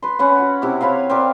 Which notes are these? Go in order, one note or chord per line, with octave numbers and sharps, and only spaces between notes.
B4 C6
C#4 B4 F#5
F#4
C3 E4 D6
C4 B4 C#5 F5
C4 A#4 D5